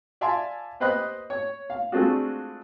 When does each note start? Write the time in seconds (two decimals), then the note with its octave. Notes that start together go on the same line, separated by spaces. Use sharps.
0.21 D5 E5 F5 G#5 A5 C6
0.80 G4 B4 C5 D#5 B5 F#6
1.30 C#5
1.70 F5
1.92 G#3 A3 C4 D4 F4 F#4